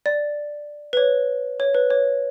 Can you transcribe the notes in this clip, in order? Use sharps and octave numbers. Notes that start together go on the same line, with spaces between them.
D5
B4
C#5
C#5
B4
C#5